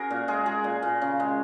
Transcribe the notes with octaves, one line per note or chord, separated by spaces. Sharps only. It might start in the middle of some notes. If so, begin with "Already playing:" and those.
Already playing: C#4 F#4 G#4 A#4
A#2
G#3 G#4
G#3 G#4
A#2
A#2
C#3
G#3